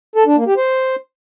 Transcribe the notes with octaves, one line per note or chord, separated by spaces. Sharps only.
A4
D4
A#3
G4
C5